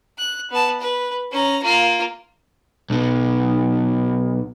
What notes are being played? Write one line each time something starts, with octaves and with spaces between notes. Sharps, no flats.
F#6
B3 A5
B4
C#4 A#5
A#3 F4
B1 B2